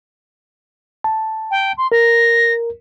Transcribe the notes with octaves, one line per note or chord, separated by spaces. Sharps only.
A5
G5
C6
A#4 A#6